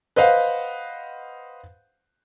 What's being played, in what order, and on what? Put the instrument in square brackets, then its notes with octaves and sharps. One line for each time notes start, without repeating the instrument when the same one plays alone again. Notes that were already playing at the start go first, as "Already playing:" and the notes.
[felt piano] B4 C5 D#5 F5 F#5